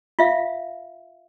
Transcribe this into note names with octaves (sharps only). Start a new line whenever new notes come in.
F4 E5 F5